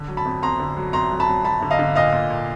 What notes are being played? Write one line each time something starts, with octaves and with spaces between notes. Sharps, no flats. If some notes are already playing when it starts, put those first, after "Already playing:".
Already playing: D3
F#3
A5 B5
F2
F2 A#5 C6
D3
F#3
F2 A#5 C6
F#3
A5 B5
F#3
F#3 A5 B5
D3
D#5 F5
D3
A#2 D#5 F5
A#2
A#2